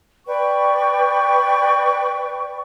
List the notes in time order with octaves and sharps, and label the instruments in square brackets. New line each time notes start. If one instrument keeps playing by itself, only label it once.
[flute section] B4 D5 G5 C#6